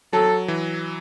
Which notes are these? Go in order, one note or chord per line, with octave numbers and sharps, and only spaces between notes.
F#3 A4
E3